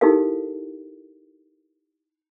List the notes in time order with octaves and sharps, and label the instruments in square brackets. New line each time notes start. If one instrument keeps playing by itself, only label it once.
[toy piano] D#4 E4 G4 A4 A#4 F5